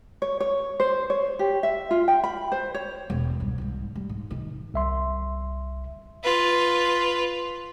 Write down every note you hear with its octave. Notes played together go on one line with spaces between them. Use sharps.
C#5
C#5
C5
C#5
G4
E5
F4
G5
B5
C5
C#5
E1
C2 G2
C2 G#2
G3
G#2
C3 D#3
C2 E5 C6
F4 B4